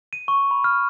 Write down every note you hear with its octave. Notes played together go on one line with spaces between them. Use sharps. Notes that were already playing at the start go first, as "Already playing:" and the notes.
D#7
C#6
B5
F6